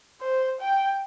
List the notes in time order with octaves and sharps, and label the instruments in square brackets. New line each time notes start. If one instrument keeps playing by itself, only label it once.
[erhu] C5
G5